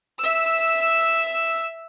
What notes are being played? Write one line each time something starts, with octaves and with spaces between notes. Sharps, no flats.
E5 E6